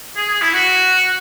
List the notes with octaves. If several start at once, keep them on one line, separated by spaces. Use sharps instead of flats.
G#4
G#4
E4
F#4